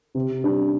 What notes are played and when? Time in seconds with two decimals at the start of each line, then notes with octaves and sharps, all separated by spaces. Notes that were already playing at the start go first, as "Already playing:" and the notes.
0.15 C3
0.44 G3 D4